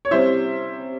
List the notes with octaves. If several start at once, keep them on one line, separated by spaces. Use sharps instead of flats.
C#5
C3 G3 C#4 E4 C5 E5